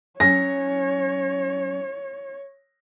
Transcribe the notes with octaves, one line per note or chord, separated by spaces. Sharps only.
F#3 C#4 C#5 G#5 A#6